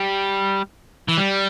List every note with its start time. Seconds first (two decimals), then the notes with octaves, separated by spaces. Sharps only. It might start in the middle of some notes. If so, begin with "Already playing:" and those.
Already playing: G3
1.08 E3
1.18 G3